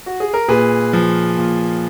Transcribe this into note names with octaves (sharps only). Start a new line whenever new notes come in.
F#4
G#4
A#4
A#2 G#4 B4
F3
A#2